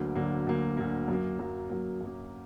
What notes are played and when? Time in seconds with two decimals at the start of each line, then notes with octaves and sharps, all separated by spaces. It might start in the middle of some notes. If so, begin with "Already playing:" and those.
Already playing: D2 D3 F#3 A#3
0.15 D2 D3 F#3 A#3
0.46 D2 D3 F#3 A#3
0.77 D2 D3 F#3 A#3
1.08 F#2 F#3 A#3
1.39 F#2 F#3 A#3
1.70 F#2 F#3 A#3
2.01 F#2 F#3 A#3